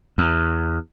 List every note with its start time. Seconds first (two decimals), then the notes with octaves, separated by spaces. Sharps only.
0.18 E2